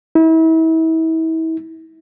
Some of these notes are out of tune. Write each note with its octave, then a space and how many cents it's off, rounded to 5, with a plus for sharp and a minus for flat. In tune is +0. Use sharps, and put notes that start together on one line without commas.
E4 -35